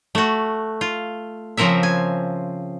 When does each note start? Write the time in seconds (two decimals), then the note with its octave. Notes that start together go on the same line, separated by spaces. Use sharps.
0.15 A3 F#4
0.81 F4
1.57 C#3 F3 C4 A#4 E5
1.83 G#5